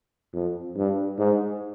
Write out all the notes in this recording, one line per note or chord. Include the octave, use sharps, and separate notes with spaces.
F2
G2
G#2